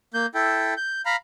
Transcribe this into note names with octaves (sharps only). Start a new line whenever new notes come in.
A#3 G6
E4 A4 G5
G6
F5 A#5 B5